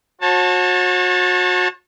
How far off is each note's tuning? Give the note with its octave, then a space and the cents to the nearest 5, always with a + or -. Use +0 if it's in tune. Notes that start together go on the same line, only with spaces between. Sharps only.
F#4 -30 C#5 -40 A5 +0